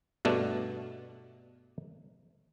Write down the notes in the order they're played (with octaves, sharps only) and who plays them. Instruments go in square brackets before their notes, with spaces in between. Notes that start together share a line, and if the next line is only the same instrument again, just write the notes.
[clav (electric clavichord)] G2 B2 A3 D4